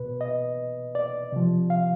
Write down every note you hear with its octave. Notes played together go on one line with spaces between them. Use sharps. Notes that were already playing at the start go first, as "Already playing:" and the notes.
Already playing: B2 B4
D#5
D5
C3 F3
F5